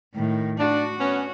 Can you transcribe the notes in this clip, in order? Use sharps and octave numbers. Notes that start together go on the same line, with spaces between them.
A2 D#3
D4 F#4
B3 C#4